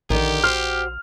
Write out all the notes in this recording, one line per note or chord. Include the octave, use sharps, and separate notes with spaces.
A#1 D3 D#3 G4
F#4 C5 F6